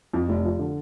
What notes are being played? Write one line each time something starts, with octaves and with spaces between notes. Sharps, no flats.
F2
F1
F3
D3